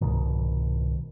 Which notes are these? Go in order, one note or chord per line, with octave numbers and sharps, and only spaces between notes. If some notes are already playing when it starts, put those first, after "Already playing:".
C2 G#2 B2 D#3